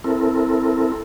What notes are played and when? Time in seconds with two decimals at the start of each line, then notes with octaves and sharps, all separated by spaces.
0.04 C4 E4 A4 A#4